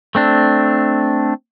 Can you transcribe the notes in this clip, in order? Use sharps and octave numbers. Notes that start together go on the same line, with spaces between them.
A3 C4 D4